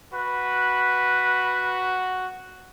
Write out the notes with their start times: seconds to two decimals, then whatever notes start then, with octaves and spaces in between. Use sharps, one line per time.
0.14 F#4 B4